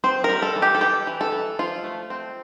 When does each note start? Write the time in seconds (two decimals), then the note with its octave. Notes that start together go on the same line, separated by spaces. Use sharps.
0.04 C4 C5
0.24 A#4
0.29 G3
0.42 A4
0.56 E3
0.62 G4
0.75 A4
0.81 E3 G4
1.07 E3
1.21 A4
1.32 E3
1.59 F3 F4
1.84 A3
2.10 C4